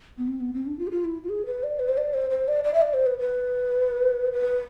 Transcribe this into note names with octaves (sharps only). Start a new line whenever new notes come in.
B3
C4
B3
C4
D4
F4
G#4
F4
E4
F4
G#4
B4
D5
B4
C5
D5
C5
C5
D5
D5
E5
D5
C5
B4
B4
B4